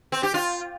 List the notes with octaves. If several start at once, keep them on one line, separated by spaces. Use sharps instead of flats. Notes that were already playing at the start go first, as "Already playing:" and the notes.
C4
G4
F4